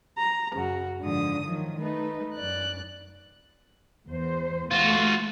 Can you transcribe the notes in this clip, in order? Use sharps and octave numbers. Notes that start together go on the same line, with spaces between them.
A#5
F#2 C#3 F#4
G#2 D3 F3 D#6
D#3 F3 F#3
A3 D#4 B4
F#2 D5 F#6
E2 C5
A3 F4 F#4